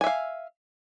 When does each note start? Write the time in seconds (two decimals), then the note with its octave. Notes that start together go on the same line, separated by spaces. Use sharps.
0.01 G#5
0.04 E5
0.07 F5